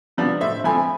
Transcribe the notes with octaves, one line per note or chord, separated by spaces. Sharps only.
C3 F3 B3 D4
A2 C5 E5
F3 A3 C4 G#5 B5